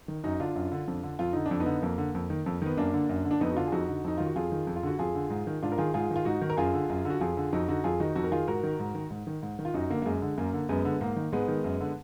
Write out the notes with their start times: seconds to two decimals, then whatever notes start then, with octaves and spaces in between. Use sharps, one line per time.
0.08 D#3
0.24 F#2 D#4 F#4
0.40 D3 D4 F4
0.56 F#2
0.72 D3
0.88 F2
1.03 D3
1.19 F2 F4
1.33 D3 D#4
1.46 D4
1.51 F2
1.60 B3 D#4
1.66 D3
1.82 F2 A#3
1.98 D3
2.15 F2
2.30 D#3
2.46 F2
2.62 D#3 B3
2.77 F#2 A#3 D4
2.94 D3
3.09 F#2
3.25 D3
3.31 D4
3.40 F2 B3 D#4
3.52 F#4
3.56 D3 D4 F4
3.67 G#4
3.72 F2 D#4 F#4
3.88 D3
4.04 F2 D#4
4.18 D#3 F4
4.26 F#4
4.36 F2 F4 G#4
4.52 D#3
4.67 F2
4.76 F4
4.83 D3 F#4
4.99 F2 F4 G#4
5.15 D3
5.30 G#2
5.47 D#3
5.63 G#2 D4 F4
5.72 A#4
5.78 D#3 F4 G#4
5.94 G#2 F4 G#4
6.11 D#3
6.16 F4
6.25 G#2 D#4 F#4
6.41 D#3
6.50 A#4
6.57 F#2 F4 G#4
6.74 D3
6.90 F#2
7.05 D3
7.10 F#4
7.20 F2 F4 G#4
7.37 D3
7.52 F2 D#4 F#4
7.68 D3 D#4 F#4
7.84 F2 F4 G#4
8.00 D#3 D#4 F#4
8.15 F2 D#4 F#4
8.24 A#4
8.31 D#3 F4 G#4
8.47 G#2 F#4 A#4
8.63 D#3
8.80 G#2
8.95 D#3
9.11 G#2
9.27 D#3
9.43 G#2
9.59 D#3
9.65 F4
9.74 F#2 D#4 F#4
9.90 D3 A#3
10.02 A#3
10.06 F#2 G#3
10.22 D3
10.38 F#2 A#3
10.53 D3
10.69 F#2 G#3 B3
10.85 D3
11.01 G#2 A#3
11.16 D#3
11.32 G#2 G#3 B3
11.48 D#3
11.64 F#2
11.80 D3